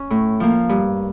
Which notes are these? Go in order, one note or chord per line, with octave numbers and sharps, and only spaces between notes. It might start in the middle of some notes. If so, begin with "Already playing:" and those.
Already playing: C#4
A2
F3 A#3
G2